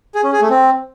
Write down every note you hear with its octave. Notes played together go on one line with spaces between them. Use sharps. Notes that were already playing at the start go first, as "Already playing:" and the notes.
G#4
C#4
G#4
A3
C4